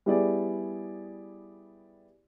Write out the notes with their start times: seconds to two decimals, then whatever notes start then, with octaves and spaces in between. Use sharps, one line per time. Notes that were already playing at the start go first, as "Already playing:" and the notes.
0.06 G3 B3 E4 G4 G#4 D5